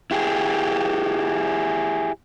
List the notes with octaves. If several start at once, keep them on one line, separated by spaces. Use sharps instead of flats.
E4 G4 G#4